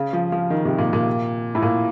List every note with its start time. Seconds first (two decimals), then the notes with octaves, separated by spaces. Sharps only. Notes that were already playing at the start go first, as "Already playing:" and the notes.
Already playing: C#3
0.13 F3
0.32 F3
0.50 D#3
0.65 C3
0.78 A#2
0.93 A#2
1.55 A2
1.62 A#2